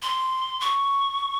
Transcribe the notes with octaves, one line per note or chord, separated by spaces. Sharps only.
C6
C#6